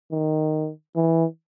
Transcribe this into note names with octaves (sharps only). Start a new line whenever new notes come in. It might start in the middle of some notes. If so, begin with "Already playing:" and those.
D#3
E3